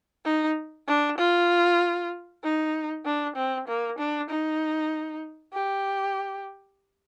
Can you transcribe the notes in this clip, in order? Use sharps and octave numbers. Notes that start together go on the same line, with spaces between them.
D#4
D4
F4
D#4
D4
C4
A#3
D4
D#4
G4